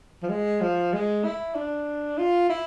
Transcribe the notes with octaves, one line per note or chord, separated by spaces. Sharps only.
F3
G#3
F3
G#3
E4
D4
F4
E4